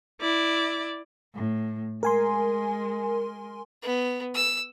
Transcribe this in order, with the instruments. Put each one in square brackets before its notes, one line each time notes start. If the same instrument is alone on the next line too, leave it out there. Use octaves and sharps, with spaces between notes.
[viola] E4 D5
[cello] A2
[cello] G#3 [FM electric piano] A#4 G#5 C6
[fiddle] B3
E6